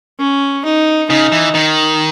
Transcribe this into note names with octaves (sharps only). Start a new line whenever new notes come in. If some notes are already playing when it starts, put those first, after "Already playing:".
C#4
D#4
C#3 D#4
E3
D#3